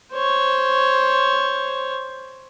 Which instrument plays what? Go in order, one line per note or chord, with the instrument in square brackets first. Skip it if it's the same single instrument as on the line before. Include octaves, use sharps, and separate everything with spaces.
[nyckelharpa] C5 C#5